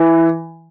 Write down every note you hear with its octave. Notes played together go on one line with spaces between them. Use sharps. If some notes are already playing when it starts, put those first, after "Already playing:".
Already playing: E3